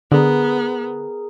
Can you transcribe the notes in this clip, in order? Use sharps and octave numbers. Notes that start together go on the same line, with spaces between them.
D3 B3 G#4 A#4 A#5